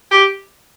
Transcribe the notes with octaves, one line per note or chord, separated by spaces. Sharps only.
G4